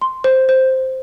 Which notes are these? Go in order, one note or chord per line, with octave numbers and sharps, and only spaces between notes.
C6
C5
C5